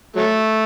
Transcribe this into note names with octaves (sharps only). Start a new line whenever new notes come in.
F#3 A3